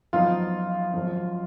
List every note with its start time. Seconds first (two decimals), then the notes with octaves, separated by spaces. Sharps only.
0.13 G#1 F#2 F3 B3 D#4 F4
0.94 G#1 F#2 F3